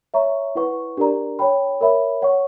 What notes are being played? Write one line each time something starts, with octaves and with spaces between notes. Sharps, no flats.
C#5 E5 A#5 C#6
E4 B4 F#5 C#6
D4 G4 A#4 D5 A#5
C#5 G5 B5
A#4 C#5 E5 B5
C#5 F#5 C#6